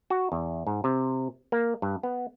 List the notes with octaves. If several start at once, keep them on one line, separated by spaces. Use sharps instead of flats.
F#4
E2
G#2
C3
A#3
G2
B3